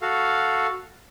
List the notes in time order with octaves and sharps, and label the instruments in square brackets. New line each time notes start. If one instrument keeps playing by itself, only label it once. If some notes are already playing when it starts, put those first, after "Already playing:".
[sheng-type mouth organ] F#4 A4 F5